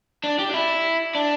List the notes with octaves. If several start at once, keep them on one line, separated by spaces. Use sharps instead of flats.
D4
G4
D4
E4
D4